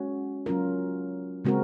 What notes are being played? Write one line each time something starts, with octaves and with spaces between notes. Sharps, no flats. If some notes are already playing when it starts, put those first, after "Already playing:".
Already playing: G#3 C#4 F#4
F#3 C#4 F4 A#4
C#3 G#3 C4 F#4 A#4